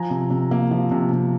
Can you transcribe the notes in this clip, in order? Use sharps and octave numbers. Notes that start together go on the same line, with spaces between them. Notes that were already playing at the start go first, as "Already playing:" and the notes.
Already playing: F3 G#5 A#5
C3
C3
A#3
F3
C3
C3